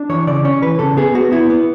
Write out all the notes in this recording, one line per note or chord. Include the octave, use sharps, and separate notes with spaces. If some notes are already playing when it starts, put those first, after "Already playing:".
Already playing: D4
E3 C#5
C#3 D5
C#4 C#5
E3 B4
C#3 A4
B3 G#4
B3 F#4
B3 E4
B3